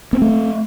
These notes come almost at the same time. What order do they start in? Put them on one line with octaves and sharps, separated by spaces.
B3 C4 A3